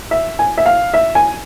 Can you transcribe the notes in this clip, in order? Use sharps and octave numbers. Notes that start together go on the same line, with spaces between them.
E5
G#5
E5
F5
E5
G#5